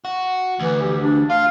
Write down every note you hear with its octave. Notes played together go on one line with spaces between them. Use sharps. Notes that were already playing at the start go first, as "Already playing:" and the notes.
F#4
D2 E3
G4
D4
F4 F5